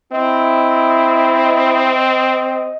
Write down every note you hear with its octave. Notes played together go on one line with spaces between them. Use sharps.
C4 E4 D#5